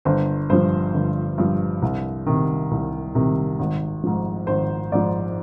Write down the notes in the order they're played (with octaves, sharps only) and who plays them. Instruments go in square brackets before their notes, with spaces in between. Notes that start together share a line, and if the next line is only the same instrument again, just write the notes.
[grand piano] G1 C5
G2 F3 C5
G1
G2 F3
C2
C3 D#3
C2
C3 D#3
G#1
G#2 F3
G#1 C5
G#2 F3 D5